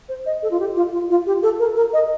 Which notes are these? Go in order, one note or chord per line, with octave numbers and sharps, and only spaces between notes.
C5
D#5
A4
F4
G4
F4
F4
F4
G4
A4
A#4
A#4
D#5